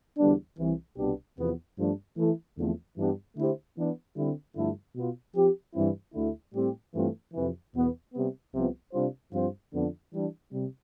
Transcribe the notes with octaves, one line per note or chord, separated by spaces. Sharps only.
E2 D3 G3 B3 D4
C2 C3 E3
C2 B2 B3 D4 G4
E2 C3 F3 B3
G2 F3 A3 D4
E3 A3 E4 A4
E2 D3 F3 A3 C4
G2 E3 B3 D4 G4
D3 A3 E4 G4 C5
E3 B3 D4
D3 G3 C4 E4
G2 D3 F3 A3 E4
B2 B3 F4
F3 C4 G4
G2 E3 G3 C4 E4
D2 D3 A3 E4
A2 G3 C4 G4
G2 E3 A3 C4 F4
F2 C3 E3
E2 B2 B3
C3 G3 B3
C2 C3 F3 B3
C3 G3 D4 F4 C5
G2 F3 C4 F4 C5
F2 D3 F3 B3 D4
E3 G3 D4
C3 G3